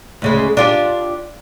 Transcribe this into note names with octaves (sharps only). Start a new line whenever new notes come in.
D2 C#3 G#3
D4 F4 G4